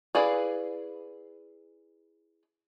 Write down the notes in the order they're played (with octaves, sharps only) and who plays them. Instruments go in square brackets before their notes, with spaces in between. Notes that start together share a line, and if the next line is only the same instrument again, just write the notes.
[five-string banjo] E4 G#4 B4 D5 F5